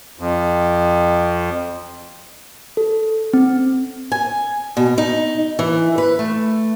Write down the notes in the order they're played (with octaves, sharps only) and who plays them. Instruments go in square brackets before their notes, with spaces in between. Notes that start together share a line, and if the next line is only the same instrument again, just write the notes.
[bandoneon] F2
[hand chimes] A4
C4
[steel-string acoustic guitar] G#5
B2
D#4
E3
B4
A3